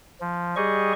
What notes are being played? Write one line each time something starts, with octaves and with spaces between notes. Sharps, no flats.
F3
G3 G4 G#4 D#5 C#6